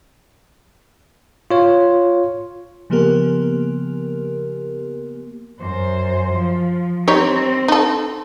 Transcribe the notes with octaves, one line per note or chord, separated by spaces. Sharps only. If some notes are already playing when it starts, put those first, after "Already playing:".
F4 C#5
C#3 F3 A#3 B3 G4 A#4
F#2 C5
F3
G3 C4 D#4 C#5
D#4 A4